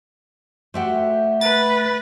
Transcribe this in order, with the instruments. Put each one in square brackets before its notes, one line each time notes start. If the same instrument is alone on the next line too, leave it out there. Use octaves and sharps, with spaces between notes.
[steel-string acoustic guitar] A3 E5 G5 [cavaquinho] F#4 G4 C5
[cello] B4 [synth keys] A6